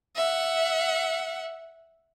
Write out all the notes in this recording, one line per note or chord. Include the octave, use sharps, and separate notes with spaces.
E5 F#5